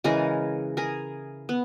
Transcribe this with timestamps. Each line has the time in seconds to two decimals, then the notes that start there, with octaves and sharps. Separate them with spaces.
0.04 C#3 E3 G#3 G#4 A#4
0.77 G#4 A#4
1.49 B3